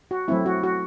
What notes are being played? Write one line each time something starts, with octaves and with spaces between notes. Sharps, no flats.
F#4
F#3 A3 C4 E4
F#4
F#4